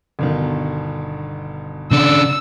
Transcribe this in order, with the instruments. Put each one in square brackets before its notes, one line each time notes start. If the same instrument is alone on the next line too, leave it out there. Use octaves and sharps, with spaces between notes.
[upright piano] G1 B2 D#3
[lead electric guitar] C#3 D4 [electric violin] E6